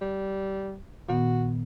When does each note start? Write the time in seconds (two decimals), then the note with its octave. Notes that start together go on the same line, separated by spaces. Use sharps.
0.01 G3
1.09 A#2 D#3 B3 F#4